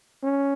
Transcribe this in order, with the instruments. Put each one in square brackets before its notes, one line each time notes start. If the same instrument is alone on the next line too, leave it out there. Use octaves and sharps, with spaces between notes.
[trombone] C#4